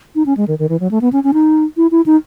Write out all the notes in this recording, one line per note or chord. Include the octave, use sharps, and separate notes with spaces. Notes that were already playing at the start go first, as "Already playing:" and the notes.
D#4
C#4
G#3
D#3
D#3
E3
F#3
A3
B3
C#4
C#4
D#4
E4
E4
D#4